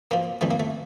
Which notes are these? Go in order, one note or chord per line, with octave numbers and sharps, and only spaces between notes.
A#2 F3 A#3
F2 E3 G3 A3
A#3
A3